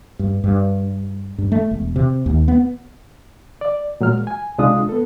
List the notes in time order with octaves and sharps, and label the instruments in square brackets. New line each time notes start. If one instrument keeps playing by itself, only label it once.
[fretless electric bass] G2
G2
G2
A3
E1
C3
D#2
B3
[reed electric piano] D5
A#2 F#3 G#3 F6
G#5
C2 C3 G#3 D4 F4 D#6
B3 A4